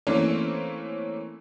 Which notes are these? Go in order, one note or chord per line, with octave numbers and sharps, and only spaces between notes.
E3 A3 A#3 C4 C#4 C5